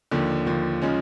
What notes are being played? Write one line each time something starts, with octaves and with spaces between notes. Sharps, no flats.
D#2 D3 F3
D#2 D3 F3
C#3 F3 G#3 C#4